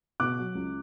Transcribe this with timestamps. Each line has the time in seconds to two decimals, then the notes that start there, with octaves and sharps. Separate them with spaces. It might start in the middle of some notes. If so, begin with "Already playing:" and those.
0.20 B2 D6 F#6
0.38 F#3
0.55 C#2